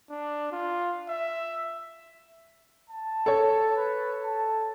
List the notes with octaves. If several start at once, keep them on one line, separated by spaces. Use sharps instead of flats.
D4
F4
E5
A5
A4 C#5
B4
A5